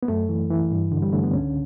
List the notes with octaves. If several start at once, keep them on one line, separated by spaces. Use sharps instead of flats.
B3
F#2 A3
E3
E3
G2
D3
G3
D3 A3
B3
C#2 C#4